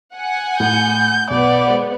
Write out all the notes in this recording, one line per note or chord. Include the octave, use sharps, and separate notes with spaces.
F#5 G#5
A2 G6
B1 B3 D5
G#3 C5 F#5